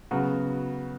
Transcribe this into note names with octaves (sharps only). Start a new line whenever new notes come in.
C#3 F#3 B3 F#4